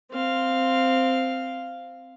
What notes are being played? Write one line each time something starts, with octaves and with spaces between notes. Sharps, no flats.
C4 F5